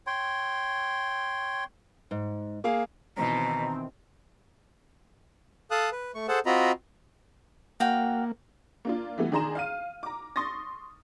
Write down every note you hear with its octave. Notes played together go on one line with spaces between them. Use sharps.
C#5 G5 C6
G#2
A#3 G#4 F5
B2 D#3 E3 C4 A#5
A4 F5 A5 D#6 F#6
B4
A3 C#6
G#4 A4 C5 F#5 A5
C4 F4 F#4 D#5 A#5 B5
A#3 F#4 F5 G5
A#3 D4 F4
E3 G3 A3 B3
D#3 D4 G#4 A#5 C6 E7
F5 F6 D#7
A#5 D6
C6 C#6 D#6 A6 A#6